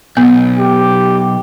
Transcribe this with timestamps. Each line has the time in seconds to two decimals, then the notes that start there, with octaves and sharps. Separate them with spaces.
0.17 B1 B3
0.59 G4